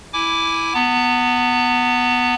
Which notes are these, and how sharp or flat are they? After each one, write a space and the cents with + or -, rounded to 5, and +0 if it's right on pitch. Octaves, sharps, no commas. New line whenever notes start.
E4 +0 G#5 +0 D6 +0
B3 +0 A5 +45